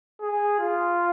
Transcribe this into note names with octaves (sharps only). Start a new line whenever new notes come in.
G#4
F4